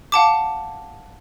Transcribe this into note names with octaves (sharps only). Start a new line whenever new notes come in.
F5 F#5 A5 D6